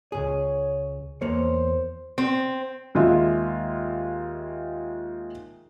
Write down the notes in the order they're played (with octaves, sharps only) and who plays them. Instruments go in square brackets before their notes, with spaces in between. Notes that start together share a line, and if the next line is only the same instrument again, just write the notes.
[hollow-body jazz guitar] C#2 G#2 G#4 [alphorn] C#5
[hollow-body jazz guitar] E2 A#3 C#5 [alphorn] C5
[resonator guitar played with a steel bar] C4
[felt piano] D#2 G#3 F4 E5